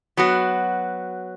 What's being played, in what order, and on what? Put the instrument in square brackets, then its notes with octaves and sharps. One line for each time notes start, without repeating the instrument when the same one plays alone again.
[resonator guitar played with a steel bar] F#3 B3 F#4